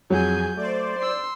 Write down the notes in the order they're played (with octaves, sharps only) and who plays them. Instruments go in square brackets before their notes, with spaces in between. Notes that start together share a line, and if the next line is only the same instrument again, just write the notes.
[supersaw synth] F2 G#5 [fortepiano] F#3 [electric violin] G#4 G6
[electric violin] A3 [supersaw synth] C5 D5
[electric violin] C6 E6